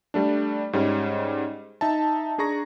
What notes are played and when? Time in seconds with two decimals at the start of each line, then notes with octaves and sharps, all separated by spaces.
0.14 G3 A3 D4
0.73 G#2 G3 C#4
1.81 D#4 E5 A5
2.38 D4 G#4 A#5 C#6 A#6